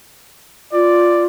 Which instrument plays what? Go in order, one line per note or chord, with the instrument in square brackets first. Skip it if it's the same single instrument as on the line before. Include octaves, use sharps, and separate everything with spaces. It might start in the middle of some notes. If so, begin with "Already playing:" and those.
[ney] F4 [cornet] D5